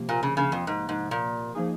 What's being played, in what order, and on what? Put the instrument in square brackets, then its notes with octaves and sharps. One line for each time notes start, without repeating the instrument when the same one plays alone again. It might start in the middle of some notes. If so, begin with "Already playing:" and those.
Already playing: [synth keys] C3 F3 A#3
[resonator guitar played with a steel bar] A#2
C#3
C#3
F2
G#2
G#2
A#2
[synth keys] F3 A#3 D#4 G#4